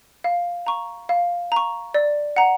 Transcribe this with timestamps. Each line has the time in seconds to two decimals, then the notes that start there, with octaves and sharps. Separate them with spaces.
0.24 F5
0.67 A#5 C#6
1.09 F5
1.52 A#5 C#6
1.94 D5
2.36 F#5 A#5